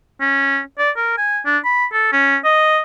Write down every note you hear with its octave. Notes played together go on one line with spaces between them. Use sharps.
C#4
D5
A#4
G#5
D4
B5
A4
C#4
D#5